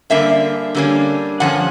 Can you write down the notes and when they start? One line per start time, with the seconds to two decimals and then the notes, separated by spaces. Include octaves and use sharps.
0.10 D3 G3 A#3 C#4 E5
0.75 D3 G3 A#3 C#4
1.40 G2 D3 F3 C#4 F#5